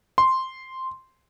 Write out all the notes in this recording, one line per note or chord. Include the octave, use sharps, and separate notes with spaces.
C6